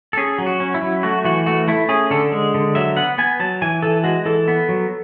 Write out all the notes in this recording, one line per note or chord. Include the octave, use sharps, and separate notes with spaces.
A4
C#4 G#4
F#3
F#4
C#4
E4
F#3
A3 F#4
E3 F#4
A3 F#4
A3 E4
C#4 G#4
D3 A4
G#3
D3
F#3 E5
B3 F#5
B3 G#5
F#3 A5
E3 G#5
E3 A4
G#3 F#4
E3 A4
B3
F#3